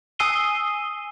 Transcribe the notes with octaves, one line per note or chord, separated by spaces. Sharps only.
G#5 D#6 E6 C7 D#7 G7